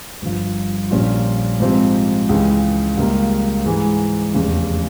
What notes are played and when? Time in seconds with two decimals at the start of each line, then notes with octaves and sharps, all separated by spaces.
0.22 G1 G2 F3
0.90 A#1 A#2 G3 C#4 F4
1.60 G#2 F3 C4 G4
2.29 C#2 C#3 E3
2.97 C#2 C#3 G3 A#3
3.66 G#2 E3 G#3
4.34 F1 E2 C#3